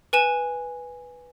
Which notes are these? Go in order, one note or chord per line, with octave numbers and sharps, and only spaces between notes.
B4 G#5 E7